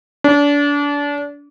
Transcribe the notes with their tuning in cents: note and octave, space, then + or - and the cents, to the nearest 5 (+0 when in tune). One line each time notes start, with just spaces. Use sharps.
D4 -30